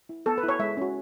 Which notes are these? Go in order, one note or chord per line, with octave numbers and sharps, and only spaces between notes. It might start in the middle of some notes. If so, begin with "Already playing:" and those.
E4
B3 A4
B4
E4 C#5
G#3 E5
C#4 F#4